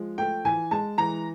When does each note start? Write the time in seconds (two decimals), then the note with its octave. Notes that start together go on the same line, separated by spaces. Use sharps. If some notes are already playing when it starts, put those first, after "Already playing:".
Already playing: F3 G#3
0.18 A3 G5
0.45 E3 G#5
0.71 G#3 A5
0.98 E3 A#5